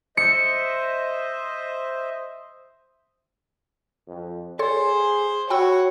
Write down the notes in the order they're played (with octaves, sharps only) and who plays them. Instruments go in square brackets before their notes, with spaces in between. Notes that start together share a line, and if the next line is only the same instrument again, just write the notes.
[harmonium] C5 D#5 E5 [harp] C#7
[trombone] F2
[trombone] G#4 [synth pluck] A4 C#5 C6 [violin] C5
[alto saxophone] F#4 [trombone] C#5 [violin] F#5 [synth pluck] G5 B5 E6